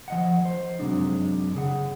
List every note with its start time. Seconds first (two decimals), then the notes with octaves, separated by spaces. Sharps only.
0.08 F3 D#5 F#5
0.45 C5
0.79 F#2 C3 F#3 G#3 D4 D#4
1.55 C#3 G#4 F#5